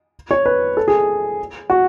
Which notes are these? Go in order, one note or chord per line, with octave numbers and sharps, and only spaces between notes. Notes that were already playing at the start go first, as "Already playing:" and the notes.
C#5
B4
A4
G#4
F#4